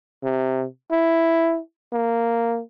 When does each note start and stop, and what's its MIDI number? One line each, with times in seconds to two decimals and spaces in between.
0.23 0.65 48
0.91 1.59 64
1.92 2.60 58